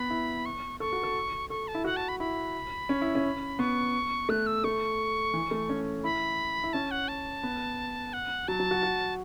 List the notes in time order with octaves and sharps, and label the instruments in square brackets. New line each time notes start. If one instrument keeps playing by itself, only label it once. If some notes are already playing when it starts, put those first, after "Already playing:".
Already playing: [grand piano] B3 [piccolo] B5
[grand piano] E4
[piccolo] C#6
[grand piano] A4 [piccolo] C#6
[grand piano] F#4
A4
[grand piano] A4 [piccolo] C#6
[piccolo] A5
[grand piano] E4
[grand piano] F#4 [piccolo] F#5
[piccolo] A5
B5
[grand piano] E4 [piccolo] B5
[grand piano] C#4
E4
C#4
[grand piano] B3 [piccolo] C#6
[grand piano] A3 [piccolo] F#6
[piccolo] E6
[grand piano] A3 [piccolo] C#6
[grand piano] E3
A3
C#4
[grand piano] E4 [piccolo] B5
[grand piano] E4
[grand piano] C#4 [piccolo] A5
[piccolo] F#5
A5
[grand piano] B3
[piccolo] F#5
[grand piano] F#3 [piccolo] A5
[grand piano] F#3
F#4
F#4